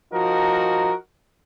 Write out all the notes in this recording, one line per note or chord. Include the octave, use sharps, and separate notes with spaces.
F3 D#4 F#4 A#4